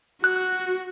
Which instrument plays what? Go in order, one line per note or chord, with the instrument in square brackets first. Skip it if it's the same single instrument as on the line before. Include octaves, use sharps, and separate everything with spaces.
[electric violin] F#4 [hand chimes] F#6